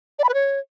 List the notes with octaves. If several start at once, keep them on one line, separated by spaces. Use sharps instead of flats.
D5
B5
B4
C#5